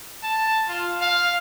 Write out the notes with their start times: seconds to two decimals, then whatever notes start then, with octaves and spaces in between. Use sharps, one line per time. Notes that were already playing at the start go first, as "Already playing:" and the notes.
0.23 A5
0.68 F4
1.02 F5